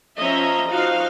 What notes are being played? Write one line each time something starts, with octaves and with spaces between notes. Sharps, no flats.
F3 C#4 D#5 E5 A#5
F3 D#4 F#4 F5